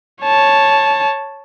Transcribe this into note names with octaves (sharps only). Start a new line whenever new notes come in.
C#5 A5